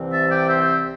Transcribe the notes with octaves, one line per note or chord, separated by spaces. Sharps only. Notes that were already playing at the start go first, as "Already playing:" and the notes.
Already playing: C2 C3 E3 C4
E5 A5
D5 G5
C5 E5